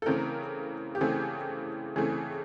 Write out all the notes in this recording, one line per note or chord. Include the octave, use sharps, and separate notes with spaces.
A4
C#3 E3 A3 C4 A#4
G4
C#3 E3 A3 C4 G#4
C#3 E3 A3 C4 G#4